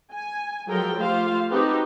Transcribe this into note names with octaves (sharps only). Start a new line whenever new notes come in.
G#5
F3 F#3 G#3 A4 A#4 G5
A3 F4 G4 C5 F5
C4 D#4 F#4 G4 A4 B4